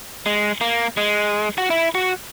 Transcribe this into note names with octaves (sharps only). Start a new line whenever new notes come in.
G#3
A#3
G#3
F#4
E4
F#4